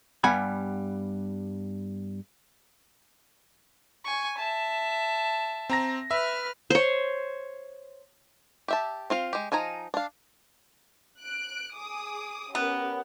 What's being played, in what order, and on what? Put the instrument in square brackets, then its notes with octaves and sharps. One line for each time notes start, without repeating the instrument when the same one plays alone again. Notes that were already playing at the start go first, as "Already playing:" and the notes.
[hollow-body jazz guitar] G2 G3 B3 F#5 G#5 B5
[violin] G#5 C#6
E5 A5
[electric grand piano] C4 A#5 A#6
[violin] B4 F6 [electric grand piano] E5
[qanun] C5 C#5
[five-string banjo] G4 E5 A5
C4 F4 F5
G#3 G4
F3 D#4 G#5 A#5
D4 F5
[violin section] F#6 D7
G#4 D6 D#6
[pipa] B3 [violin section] C#4 G4 A#4